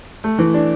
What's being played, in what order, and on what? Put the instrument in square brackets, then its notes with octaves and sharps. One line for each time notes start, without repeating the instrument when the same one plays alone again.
[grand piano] A3
E3
D4